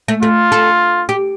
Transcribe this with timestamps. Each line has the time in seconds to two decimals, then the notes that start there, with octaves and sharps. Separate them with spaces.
0.08 A3
0.22 A3 F4
0.52 A4
1.09 G4